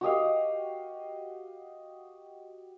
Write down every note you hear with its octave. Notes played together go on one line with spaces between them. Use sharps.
F#4 G4 D#5 F5